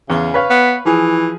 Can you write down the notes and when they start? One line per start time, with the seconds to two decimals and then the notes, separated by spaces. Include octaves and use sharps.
0.10 E2 C#3
0.34 B4 C#5 F5
0.50 B3
0.85 E3 F3 G#4